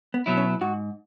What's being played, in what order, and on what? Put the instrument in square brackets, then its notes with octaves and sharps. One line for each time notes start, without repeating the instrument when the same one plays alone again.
[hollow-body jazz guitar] B3
[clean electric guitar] B2 F#3 E4
[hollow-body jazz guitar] C#4
[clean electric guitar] G#2 [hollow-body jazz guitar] F#4